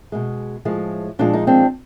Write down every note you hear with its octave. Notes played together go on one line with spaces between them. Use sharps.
B2 G#3
A2 F3 G#3
A#2 F3 G#3 D4
D#4
C4 D4